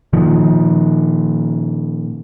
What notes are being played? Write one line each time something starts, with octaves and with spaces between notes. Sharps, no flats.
A#2 D#3 F3